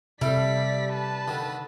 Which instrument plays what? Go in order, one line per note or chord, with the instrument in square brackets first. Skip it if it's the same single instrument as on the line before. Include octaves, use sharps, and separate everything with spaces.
[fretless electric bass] C3 [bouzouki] G3 [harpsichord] E4 A4 [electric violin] D5 B6
[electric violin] B4 A5
[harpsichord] D3 D#3